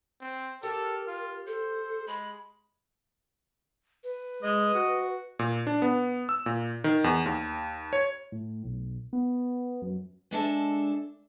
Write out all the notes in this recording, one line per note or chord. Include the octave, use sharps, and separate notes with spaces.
C4
G4 A4 A#4
F4
A4 C5
G#3 B5
B4
G#3 D#5
F#4
A#2
D4
B3
E6
A#2
D#3
E2
D#2
C#5
A2
B1
B3
F#2
G#3 D4 A4 E5